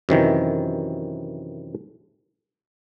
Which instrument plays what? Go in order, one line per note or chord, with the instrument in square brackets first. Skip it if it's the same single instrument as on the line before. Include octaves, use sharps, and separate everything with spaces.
[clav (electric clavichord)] F#2 C3 D#3 E3